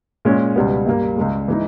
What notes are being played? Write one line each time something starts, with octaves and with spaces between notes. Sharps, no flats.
A#2 G#3 C#4
C#2 B2 G3 B3
G2 G3 A#3
C#2 C#3 G#3
E3 G#3 D#4